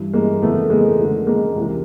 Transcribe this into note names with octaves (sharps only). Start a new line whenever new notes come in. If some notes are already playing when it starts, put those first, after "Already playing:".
Already playing: G2 E3
G#3 A#3
F2 C#3 E3 A3 B3
G#3 A#3
F2 D3
G#3 A#3
C#2 C3 E3